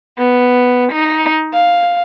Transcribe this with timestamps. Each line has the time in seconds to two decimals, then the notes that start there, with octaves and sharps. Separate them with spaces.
0.18 B3
0.92 D#4
1.53 F5